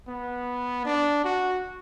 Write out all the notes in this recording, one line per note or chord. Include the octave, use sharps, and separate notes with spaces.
B3
D4
F#4